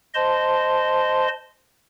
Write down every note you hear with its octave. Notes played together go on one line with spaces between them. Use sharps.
C5 D#5 A5 C6